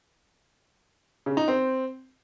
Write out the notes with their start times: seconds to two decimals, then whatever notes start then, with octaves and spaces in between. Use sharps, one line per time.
1.26 C#3
1.37 D#4
1.48 C4